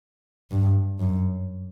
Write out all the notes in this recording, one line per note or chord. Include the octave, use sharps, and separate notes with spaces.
G2
F#2